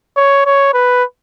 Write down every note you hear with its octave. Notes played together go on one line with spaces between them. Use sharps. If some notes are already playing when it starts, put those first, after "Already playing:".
C#5
C#5
B4